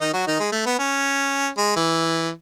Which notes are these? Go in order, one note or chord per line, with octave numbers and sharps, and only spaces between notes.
D#3 D#4
F#3 F#4
D#3 D#4
G#3
A3
B3
C#4
G#3
E3